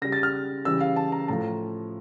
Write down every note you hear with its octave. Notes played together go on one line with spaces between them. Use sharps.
C#3 G3 A#6
A6
F6
C#3 E3 G3 E6
F5
A5
A#5
A2 F3 A#5